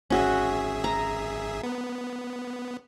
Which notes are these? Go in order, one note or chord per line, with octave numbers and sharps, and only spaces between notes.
G#1 C#4 F#4 G#4 E5
A#5
B3